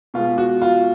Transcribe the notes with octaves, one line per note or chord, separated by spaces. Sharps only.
B2 G#3 F4
F#4
F4